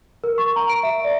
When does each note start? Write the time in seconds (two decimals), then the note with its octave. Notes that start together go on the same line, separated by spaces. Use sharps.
0.24 A#4
0.38 C#6
0.56 A#5
0.69 D7
0.83 E5
1.04 D5